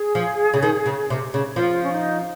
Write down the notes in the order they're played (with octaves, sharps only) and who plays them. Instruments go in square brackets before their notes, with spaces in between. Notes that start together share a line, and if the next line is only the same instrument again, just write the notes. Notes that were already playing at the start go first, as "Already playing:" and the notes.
Already playing: [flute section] G#4
[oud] F3
C#3
D#3
C#3
C3
C#3
[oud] F3 [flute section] F4
[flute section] C#4
D#4